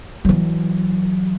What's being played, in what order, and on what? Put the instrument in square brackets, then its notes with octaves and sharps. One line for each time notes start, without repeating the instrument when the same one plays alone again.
[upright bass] E3 F#3